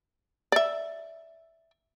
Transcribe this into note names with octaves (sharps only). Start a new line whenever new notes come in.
D5 E5